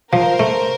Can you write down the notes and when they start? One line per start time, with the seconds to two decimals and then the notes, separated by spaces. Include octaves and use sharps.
0.13 F3 A#4 C5
0.40 A3